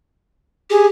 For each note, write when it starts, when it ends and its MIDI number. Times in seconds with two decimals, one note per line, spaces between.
0.70 0.88 67
0.70 0.87 68